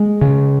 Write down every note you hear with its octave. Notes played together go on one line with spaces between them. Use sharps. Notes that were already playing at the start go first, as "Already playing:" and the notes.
Already playing: G#3
C#3